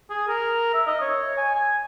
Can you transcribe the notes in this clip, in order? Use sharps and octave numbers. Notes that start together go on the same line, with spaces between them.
G#4
A#4
E5
D#5
C#5
G#5
G#5